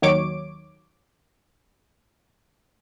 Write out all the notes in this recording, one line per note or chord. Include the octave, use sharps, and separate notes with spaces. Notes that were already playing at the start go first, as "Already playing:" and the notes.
D#2 D#3 F#3 C#5 D6 D7